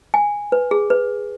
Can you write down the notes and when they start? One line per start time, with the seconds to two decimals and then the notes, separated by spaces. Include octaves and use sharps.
0.14 G#5
0.52 B4
0.71 G#4
0.90 B4